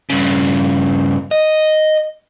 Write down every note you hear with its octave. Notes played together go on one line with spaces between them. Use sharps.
G2 C#3
D#5